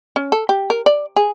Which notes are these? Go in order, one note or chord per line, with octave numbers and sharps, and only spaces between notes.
C#4
A4
G4
A#4
D5
G#4